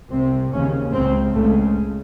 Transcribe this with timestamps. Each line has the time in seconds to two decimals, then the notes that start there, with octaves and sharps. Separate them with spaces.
0.10 C2 C3 C4
0.51 D#2 C#3 C#4
0.92 C#2 C#3 C4
1.33 C#2 C#3 A3